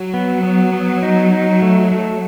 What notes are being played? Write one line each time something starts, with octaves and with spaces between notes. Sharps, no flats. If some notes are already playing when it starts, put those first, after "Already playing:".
Already playing: F#3
B3
B3
B3
D#4
D#4
A3
A3